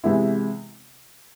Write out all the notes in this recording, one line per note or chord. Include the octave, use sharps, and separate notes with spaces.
C3 E3 G#3 B3 E4